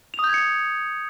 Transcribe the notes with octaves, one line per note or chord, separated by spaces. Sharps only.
F7
D#6
G6
G#6
C#7